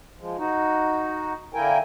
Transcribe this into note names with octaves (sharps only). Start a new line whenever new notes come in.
F3 G#3
D#4 F#4
D3 A#3 E4 A#4 G5 G#5